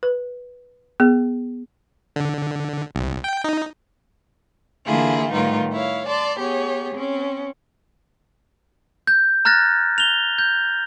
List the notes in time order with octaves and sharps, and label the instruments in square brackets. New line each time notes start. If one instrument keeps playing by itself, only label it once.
[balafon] B4
B3 G#4
[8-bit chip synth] D3
C2
G5
D#4
[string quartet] D3 E3 A#3 E4 F4 G#4
A2 D#3 G3 B3 D#4 F4
E4 C#5 F5
D5 A5 C6
B3 G4 G#4 C#5
C4 C#4
[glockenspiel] G6
A#5 F6 F#6 A6 A#6
F7 G7
G6